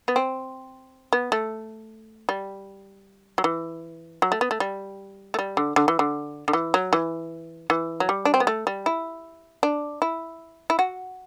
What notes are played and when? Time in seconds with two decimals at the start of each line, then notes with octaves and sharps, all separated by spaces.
0.08 B3
0.16 C4
1.13 B3
1.32 A3
2.29 G3
3.38 F#3
3.44 E3
4.22 F#3
4.32 A3
4.41 B3
4.51 A3
4.60 G3
5.34 A3
5.39 G3
5.57 D3
5.76 D3
5.88 E3
5.99 D3
6.48 D3
6.53 E3
6.74 F#3
6.93 E3
7.70 E3
8.00 F#3
8.09 G3
8.25 D4
8.34 C4
8.40 B3
8.47 A3
8.67 G3
8.86 E4
9.63 D4
10.02 E4
10.70 E4
10.79 F#4